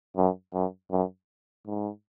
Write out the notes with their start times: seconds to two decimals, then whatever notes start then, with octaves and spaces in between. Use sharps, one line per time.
0.17 F#2
0.54 F#2
0.91 F#2
1.66 G#2